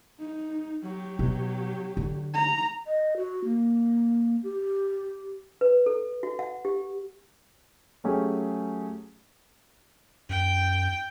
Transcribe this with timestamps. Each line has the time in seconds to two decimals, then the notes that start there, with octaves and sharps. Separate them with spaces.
0.19 D#4
0.83 F#3 G4
1.19 B2
1.97 D3
2.34 A#5
2.85 D#5
3.17 F#4
3.44 A#3
4.43 G4
5.61 B4
5.86 A4
6.23 F#4
6.39 F#5
6.65 G4
8.04 F#3 A3 C#4 G4 G#4
10.30 F#2 G5